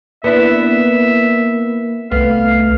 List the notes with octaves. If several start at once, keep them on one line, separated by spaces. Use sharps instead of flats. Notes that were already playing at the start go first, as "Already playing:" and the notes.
A#3 B3 D4 E4 E5
C2 A3 B3 F5